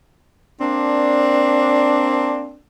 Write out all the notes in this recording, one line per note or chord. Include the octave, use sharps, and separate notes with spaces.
A#3 C4 D4